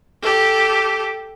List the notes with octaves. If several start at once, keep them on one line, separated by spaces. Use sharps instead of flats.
G4 A4